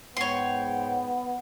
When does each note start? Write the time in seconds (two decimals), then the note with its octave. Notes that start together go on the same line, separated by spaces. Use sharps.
0.17 G#2 B3 C#5 G5 C6